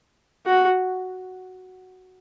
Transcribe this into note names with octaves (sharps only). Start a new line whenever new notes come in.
F#4